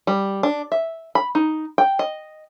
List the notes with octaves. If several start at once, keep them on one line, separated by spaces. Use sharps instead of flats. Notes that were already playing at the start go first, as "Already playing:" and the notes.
G3
D4
E5
B5
D#4
G5
D#5